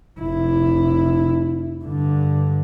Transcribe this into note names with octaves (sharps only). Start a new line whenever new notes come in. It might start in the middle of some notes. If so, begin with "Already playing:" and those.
F1 E4
G2 D3